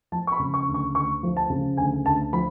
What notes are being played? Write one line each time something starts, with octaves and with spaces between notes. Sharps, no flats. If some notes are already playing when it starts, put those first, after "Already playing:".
F3 A5
C#6
B5
C#3
C#6
D2
C#6
D2 C#6
F3
A5
C#3
D2 G#5
D2 A5
F3 B5